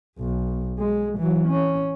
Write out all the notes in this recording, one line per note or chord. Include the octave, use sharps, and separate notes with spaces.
B1
G#3
E3 F#3
C#4